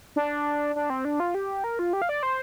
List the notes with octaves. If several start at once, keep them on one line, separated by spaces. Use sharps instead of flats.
D4
D4
C4
D4
F4
G4
A#4
F4
G4
F5
D5
C5